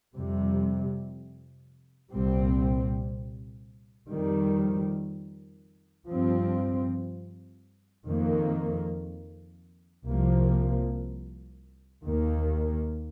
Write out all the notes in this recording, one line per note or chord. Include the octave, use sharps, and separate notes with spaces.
F2 C3 G3
C2 A#2 G3 C4
F2 D#3 G3
G2 F3 C4
F2 D#3 A#3
C2 C3 F3 A#3
D#2 D#3 A#3